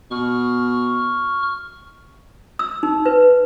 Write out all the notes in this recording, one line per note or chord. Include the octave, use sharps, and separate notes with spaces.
B2 C#6 F6
E6
D#4
B4